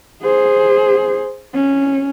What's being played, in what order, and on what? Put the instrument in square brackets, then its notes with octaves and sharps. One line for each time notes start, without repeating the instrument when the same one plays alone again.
[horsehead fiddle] G#4 C5
C#4